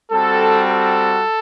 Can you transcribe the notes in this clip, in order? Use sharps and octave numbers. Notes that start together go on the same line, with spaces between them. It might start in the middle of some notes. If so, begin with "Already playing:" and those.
G3 C4 F#4 A4
A4